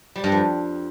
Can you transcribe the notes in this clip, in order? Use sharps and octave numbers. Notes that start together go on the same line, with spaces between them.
G3
G2
F2